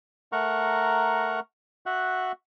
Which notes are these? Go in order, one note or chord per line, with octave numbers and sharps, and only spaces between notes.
A3 A#4 F#5 A#5 C#6
F#4 E5 F#5 F#6